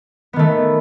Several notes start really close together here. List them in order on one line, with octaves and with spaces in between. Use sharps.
B3 D#3 A3